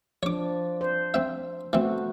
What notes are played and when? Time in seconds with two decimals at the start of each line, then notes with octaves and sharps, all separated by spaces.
0.23 F3 D4 C#5 D6
0.81 C5
1.14 C4 E5
1.73 E3 A3 B3 C4 F#4